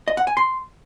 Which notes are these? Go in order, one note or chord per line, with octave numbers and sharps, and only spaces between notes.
D#5
F#5
G#5
C6